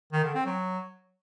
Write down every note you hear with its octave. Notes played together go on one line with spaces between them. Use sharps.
D#3
D3
C4
F#3